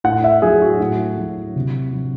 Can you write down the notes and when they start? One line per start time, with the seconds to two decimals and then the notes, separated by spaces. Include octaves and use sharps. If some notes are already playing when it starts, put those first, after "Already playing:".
0.04 A2 F#5
0.24 E5
0.42 F#3 G#4
0.62 F#4
0.80 A2
1.18 F#3
1.56 C3
1.93 F#3